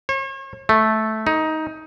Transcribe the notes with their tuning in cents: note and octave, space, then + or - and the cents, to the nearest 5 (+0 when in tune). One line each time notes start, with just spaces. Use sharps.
C#5 -45
A3 -10
D#4 +15